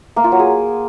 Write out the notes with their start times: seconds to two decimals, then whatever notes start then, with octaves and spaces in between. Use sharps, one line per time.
0.16 A#3
0.24 F4
0.32 F#3
0.39 G#4